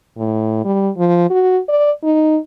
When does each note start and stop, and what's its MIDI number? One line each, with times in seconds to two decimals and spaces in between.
0.18 0.60 45
0.65 0.89 55
0.97 1.28 53
1.30 1.59 66
1.69 1.91 74
2.04 2.37 63